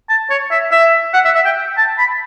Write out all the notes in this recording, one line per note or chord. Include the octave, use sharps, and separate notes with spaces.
A5
C#5
E5
E5
F#5
E5
E5
G5
A5
B5